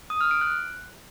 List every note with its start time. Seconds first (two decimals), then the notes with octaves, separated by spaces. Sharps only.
0.10 D#6
0.21 F6
0.31 D7
0.41 F#6